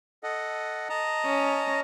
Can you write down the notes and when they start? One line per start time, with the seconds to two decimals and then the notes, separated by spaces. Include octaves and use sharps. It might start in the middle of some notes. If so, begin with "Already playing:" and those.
0.23 A4 D#5 F#5
0.89 D#5 A5 A#5
1.26 C#4